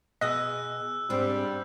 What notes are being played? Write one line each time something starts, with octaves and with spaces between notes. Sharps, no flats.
B2 G#4 D#5 G#5 D#6 E6 F#6
G#2 G3 C4 D4